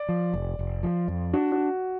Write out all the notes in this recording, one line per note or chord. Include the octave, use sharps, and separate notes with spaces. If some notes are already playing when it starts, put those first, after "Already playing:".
Already playing: D5
F3
F1
F1
F3
F2
D4 F#4
F#4